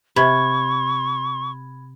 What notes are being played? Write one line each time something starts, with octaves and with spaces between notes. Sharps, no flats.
C3 B5 C#6 G#6